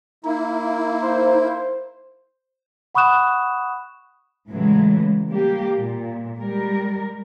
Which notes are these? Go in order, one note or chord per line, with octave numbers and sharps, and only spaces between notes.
A#3 D#4 E4
C5
F#5 B5 C#6 D#6 F#6 E7
A2 C#3 E3 F#3 G#3
G3 A#3 G4
A#2
G3 G#3 A#4